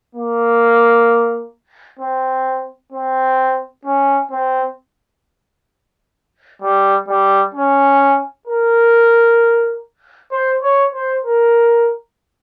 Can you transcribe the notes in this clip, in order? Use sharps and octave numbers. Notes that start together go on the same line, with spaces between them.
A#3
C4
C4
C#4
C4
G3
G3
C#4
A#4
C5
C#5
C5
A#4